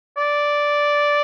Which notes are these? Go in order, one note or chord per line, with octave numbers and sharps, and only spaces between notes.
D5